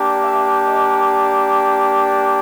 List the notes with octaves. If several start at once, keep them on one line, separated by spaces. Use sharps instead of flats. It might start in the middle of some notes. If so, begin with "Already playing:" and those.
Already playing: A#3 D4 G4
E5
D#5